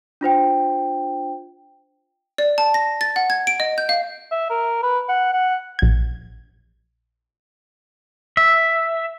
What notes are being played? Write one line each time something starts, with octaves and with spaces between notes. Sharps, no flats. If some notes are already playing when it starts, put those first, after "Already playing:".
D4 F4 C5 G5
D5
A5
A#6
A6
F#5
G#6
D7
D#5
G6
F5
E5
A#4
B4
F#5
F#5
A#1 G#6
E5